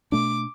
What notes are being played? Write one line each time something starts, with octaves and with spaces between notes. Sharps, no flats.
B2 A3 D4 D6